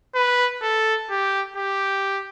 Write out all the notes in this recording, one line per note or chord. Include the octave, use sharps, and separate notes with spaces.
B4
A4
G4
G4